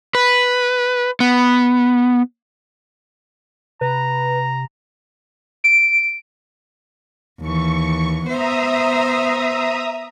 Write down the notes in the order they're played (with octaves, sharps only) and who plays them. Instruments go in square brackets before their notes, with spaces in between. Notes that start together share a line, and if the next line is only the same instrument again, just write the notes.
[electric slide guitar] B4
B3
[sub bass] C3 [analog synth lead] B4 [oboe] A#5
[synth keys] D7
[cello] D#2 E3 [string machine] C#6
[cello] B3 C5 [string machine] E5 A#5 D#6